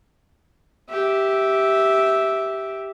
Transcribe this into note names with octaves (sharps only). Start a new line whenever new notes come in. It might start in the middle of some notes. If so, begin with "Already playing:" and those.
G4 E5